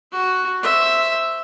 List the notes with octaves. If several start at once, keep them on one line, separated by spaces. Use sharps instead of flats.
F#4
C5 E5